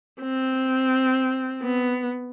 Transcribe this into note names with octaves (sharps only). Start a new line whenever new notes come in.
C4
B3